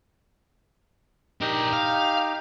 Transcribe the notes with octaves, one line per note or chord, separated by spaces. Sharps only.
D4 D#4 G4 A#4
F5